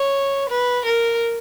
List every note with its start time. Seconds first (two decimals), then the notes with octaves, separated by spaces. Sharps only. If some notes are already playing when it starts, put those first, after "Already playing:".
Already playing: C#5
0.50 B4
0.86 A#4